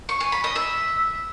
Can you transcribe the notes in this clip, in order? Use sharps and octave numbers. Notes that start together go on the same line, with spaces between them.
C#6
G#5
B5
D#5
E5